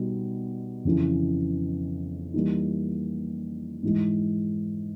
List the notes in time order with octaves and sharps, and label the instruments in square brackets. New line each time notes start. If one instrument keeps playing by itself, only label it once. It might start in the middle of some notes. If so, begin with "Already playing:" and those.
Already playing: [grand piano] B2 G3 B3 D#4 F#4
F2 C#3 E3
E3 G3 A#3 D#4
G#2 E3 G#3